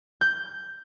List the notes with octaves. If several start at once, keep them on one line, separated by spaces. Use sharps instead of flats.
G6